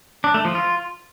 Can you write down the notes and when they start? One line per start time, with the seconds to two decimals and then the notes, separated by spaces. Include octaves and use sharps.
0.24 D4
0.34 A3
0.45 F3
0.55 F4